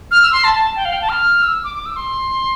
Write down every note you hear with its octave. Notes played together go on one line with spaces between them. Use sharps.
F6
E6
C6
A5
A5
G5
F5
G5
A5
F6
E6
D6
D6
E6
C6